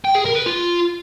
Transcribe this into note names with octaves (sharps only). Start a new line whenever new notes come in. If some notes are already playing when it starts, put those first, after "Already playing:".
G5
G#4
A#4
B4
F4